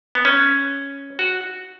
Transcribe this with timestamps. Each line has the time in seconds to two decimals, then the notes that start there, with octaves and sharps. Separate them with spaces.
0.15 B3
0.25 C#4
1.19 F#4